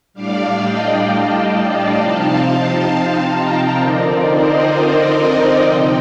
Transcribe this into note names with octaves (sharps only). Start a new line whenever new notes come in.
A2 G3 D4 D5 F5
D#5 G5
F5 A5
C3 F3 C4 D#4
F5 A5
G5 A#5
D3 F3 C4 D#4 A#4 D5
C5 D#5
C5 D#5
C3 F3 C4 D#4 D#5 G5